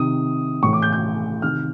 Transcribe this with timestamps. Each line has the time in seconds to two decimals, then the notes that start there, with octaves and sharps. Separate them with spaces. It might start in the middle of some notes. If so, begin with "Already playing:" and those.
Already playing: C3 D#3 D#6
0.63 A2 E3 C#6
0.73 D6
0.82 G6
0.93 G6
1.42 C3 D#3 F6